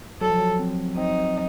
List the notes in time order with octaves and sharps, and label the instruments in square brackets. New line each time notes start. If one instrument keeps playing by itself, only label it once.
[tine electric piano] F#3 [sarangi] A4
[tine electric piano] F3
F#3
C4
[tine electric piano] C4 [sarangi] D#4